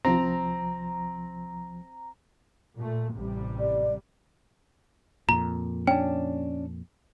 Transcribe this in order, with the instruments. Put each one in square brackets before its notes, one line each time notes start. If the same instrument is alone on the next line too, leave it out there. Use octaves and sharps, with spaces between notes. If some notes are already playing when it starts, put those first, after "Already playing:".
[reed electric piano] C2 F3 [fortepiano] C4 [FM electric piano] A#5
[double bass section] A#2 A3
A1 C3 G3
[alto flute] D5
[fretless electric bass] F2 A#2 [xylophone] A#5
[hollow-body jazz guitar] C#4 D4 [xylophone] G5